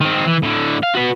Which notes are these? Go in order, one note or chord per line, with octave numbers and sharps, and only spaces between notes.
D#3 C4
E3
A2 D3
F5
F#4 B4